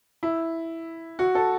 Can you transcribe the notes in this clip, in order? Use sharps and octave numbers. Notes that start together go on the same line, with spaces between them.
E4
F#4
A4